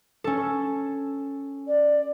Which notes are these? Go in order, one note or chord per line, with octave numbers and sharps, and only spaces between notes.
C#4 A4
D5